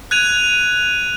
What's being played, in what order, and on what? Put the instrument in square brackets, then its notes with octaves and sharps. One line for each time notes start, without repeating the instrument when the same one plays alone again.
[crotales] F#6 G#6 D#7 F7